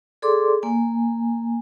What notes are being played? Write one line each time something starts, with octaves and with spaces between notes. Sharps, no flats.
G#4 A4 D5 C6 D6
A#3 G#5